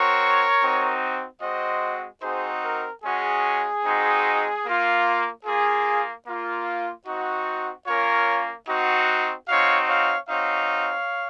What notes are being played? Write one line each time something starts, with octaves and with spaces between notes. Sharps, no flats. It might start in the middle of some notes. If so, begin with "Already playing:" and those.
Already playing: C4 F#4 A#4 C#5
C4 D#4 F#4
G#3 C4 F#4 C5 D#5
C4 D#4 F#4 G#4 C5
A#4
G#3 C#4 F#4 G#4
G#3 C4 D#4 F#4
A#3 F4
A#3 F4 G#4
A#3 F4
C4 D#4 F#4
A#3 C#4 F4 A#4 C#5
C4 D#4 F#4
C4 D#4 F#4 C#5 F5
C#5 F5
C4 D#4 F#4 C#5 F5